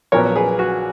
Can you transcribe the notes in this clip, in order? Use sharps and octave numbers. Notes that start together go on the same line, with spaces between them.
A#1 A#2 F#3 B3 A#4 C#5
G#4 B4
F#4